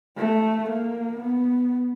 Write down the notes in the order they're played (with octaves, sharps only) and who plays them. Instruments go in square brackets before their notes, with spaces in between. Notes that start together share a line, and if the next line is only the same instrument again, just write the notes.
[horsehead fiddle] A3
A#3
B3